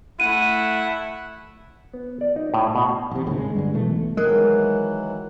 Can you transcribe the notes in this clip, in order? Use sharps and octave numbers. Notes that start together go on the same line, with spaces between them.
A3 E4 F#5 D#7
B3
D5
D#4
A2
B2
A1 C3
D#2 G#2 C#3
G#3
G2 D3 G#3
B1 B2 E3 A3
D#3 E3 F#3 G#3 A#4 F#6